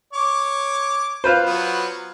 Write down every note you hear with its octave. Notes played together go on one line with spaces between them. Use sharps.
C#5 D6
F4 B4 C5
F#3 B3